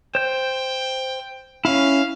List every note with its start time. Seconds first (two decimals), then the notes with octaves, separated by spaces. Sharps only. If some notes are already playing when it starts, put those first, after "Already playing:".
0.15 C5 G5 G6
1.65 C#4 E4 F5